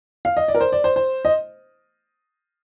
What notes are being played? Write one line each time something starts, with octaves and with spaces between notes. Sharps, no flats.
F5
D#5
D5
A#4
C5
D5
C5
C5
D#5